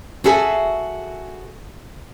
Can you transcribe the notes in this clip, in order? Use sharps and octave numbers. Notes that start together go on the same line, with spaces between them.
F#4 G#4 A4 E5 G#5